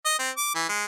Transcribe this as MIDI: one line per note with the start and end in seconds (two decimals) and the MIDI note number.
0.05 0.16 75
0.19 0.30 60
0.37 0.51 86
0.55 0.64 52
0.69 0.85 56